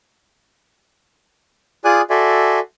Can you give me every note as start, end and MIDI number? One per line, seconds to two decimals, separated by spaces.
1.85 2.01 65
1.85 2.01 68
1.85 2.01 74
1.85 2.01 80
1.85 2.01 87
1.85 2.01 90
2.10 2.59 66
2.10 2.59 69
2.10 2.59 74
2.10 2.59 76
2.10 2.59 80
2.10 2.59 84